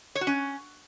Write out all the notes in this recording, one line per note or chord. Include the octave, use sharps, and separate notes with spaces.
C#5
F#4
C#4